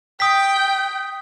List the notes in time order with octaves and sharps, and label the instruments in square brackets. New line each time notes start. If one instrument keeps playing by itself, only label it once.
[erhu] G5 [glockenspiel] D#6 B6